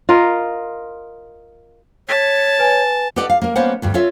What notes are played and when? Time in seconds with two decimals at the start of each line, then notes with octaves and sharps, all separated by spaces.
0.09 F4 A#4 D#5
2.09 C#5 A5 B6
2.59 B4 G#5
3.16 G4 A4 B4 D5 D#5 F#5
3.30 F5
3.42 A#3 A#4
3.56 G3 A#3 B3 C#4 C5 F#5
3.82 D2 G2 G3
3.94 F4 A4 C#5 E5